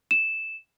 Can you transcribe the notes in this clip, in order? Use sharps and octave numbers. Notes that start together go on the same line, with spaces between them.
E7